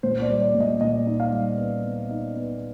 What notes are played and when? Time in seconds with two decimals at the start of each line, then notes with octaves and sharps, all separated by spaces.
0.03 A#2 C5
0.22 D5
0.29 G3
0.41 D5
0.54 A#2
0.61 D#5
0.81 A#2 D#5
1.07 D#4
1.20 F5
1.32 G3
1.58 B3
1.84 B3
2.11 D#4
2.36 B3